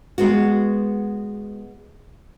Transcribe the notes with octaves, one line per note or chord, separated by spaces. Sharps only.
G#3 B3 F#4